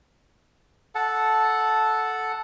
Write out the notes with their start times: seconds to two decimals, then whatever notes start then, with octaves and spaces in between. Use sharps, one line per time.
0.95 A4 F#5 A5